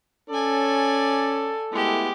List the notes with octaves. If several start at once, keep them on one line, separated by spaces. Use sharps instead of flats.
C#4 A4 D5 G#5
G#3 A3 B3 E4 G4